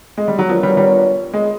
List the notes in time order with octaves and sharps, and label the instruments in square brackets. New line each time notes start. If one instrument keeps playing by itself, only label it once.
[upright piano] G#3
G3
F#3
[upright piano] F3 [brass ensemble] B3 D4 F4 A#4 C#5
[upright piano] G3
G3
G#3